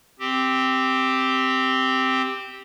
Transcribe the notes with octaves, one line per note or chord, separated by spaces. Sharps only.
C4 G4